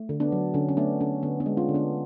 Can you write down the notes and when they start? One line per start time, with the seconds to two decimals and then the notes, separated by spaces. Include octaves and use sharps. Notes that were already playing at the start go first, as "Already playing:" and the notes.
Already playing: A3
0.09 D3
0.20 B3 D4
0.32 F#3
0.54 D3 C#4
0.69 C#4
0.77 A3 B3 D4
1.01 D3 C#4
1.23 D3 B3
1.40 B3 D4
1.46 G#3
1.57 C#4 F4
1.69 D3
1.74 B3 D4